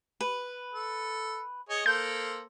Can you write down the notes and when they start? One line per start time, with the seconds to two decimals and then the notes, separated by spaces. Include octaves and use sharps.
0.21 B4
0.73 A4
1.69 G#4 C#5 D#5
1.86 A#3 A4 C5 G6